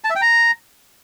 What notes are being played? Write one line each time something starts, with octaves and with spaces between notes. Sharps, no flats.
A5
E5
G5
A#5